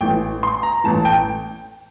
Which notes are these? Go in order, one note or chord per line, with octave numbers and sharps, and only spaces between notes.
A1 A2 E3 G5
C6
A#5
A1 A2 E3 A5
G5